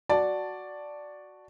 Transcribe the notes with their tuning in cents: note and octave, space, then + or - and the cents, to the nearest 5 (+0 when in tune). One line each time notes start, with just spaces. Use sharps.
F#4 +0 D5 +0 A5 +0